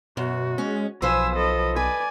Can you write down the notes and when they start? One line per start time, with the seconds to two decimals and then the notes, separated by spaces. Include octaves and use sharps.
0.17 F#2 B2 F#4
0.58 G#3 C#4
1.02 B1 F3 B4 C5 G#5 E6
1.36 A4 D#5
1.76 B4 D5 G#5